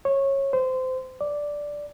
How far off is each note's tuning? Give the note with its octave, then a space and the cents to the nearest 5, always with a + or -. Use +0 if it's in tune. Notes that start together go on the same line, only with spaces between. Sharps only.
C#5 -20
C5 -20
D5 -5